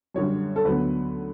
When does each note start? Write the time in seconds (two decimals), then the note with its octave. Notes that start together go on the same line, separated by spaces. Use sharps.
0.14 F#2 D3 G3 C#5
0.56 A4
0.65 D2 D3 F#3 B3 B4